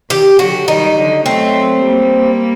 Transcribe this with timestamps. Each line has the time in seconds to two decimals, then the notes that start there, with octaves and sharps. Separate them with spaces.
0.10 D#3 G4
0.39 D3 F#3 F#4
0.68 D#3 G3 D#4
0.97 D3 F#3
1.26 F#3 A3 C4
1.84 G3 A#3